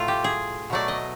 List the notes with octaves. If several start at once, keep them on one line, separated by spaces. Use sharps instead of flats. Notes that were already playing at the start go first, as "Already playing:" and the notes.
Already playing: A2 F#3 A3 F4
G4
G#4
B2 F#3 A3 D5
D#5